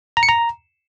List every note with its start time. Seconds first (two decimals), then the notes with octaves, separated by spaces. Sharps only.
0.17 A#5
0.23 C#7
0.29 A#5